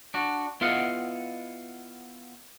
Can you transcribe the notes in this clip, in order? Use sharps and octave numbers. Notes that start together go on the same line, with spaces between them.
D4 F#4
B3 E4 F4 D#5 F5 F#5